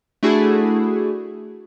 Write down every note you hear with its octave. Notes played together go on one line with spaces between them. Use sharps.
A3 D4 E4 F#4 G#4